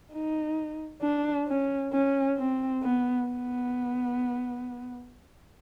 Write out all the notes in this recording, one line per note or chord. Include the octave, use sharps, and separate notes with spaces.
D#4
D4
C#4
C#4
C4
B3
B3